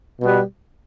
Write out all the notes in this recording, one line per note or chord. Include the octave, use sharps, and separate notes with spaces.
B2 G3 B3